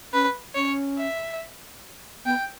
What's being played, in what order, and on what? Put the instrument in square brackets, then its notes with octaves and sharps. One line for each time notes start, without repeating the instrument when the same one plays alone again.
[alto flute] C#4 [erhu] B4
[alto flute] C#4 [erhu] C#5
[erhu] E5
[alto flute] B3 [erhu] G5